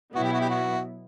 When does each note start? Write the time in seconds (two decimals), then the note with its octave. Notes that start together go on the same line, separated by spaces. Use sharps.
0.14 B2 F#3 B3 E4 F#4
0.24 G4
0.33 F#4
0.41 G4
0.49 F#4